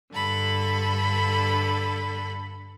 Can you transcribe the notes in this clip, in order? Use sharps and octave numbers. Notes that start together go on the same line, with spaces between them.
G2 D3 A4 B5